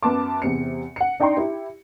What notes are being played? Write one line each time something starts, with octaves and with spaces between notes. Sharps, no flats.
F#2 B3 A5 D6
E2 C3 C#7
F#5 C#7
D4 D#4 D5 G5 A#5 C6
E4 G4